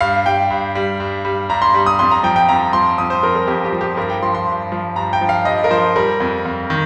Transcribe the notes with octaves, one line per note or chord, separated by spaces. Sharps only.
G2 F5
G3 G5
G2
G3
G2
G3
G2 A#5
C6
G3
D#6
F2 C6
A#5
F3 G5
G5
F2 A#5
F3 C6
F2 D#6
C5
F3 A#4
A#4
F2 G4
G4
F3
G4
G2 A#4
G5
F3 C6
C6
G2
F3
G2 A#5
G5
F3
F5
G2 D#5
A#4
F3 C5
G3 A#4
F2
F2
D#3